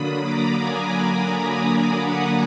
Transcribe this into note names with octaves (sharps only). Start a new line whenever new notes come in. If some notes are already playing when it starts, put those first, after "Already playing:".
Already playing: D3 F#3 A#3 D4 B5 D#6
A#5 D6
G#5 B5
F#5 A#5